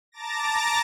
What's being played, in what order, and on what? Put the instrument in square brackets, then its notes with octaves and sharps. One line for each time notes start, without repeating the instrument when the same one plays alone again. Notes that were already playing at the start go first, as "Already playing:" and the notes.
[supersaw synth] A5 A#5 D6 A6 A#6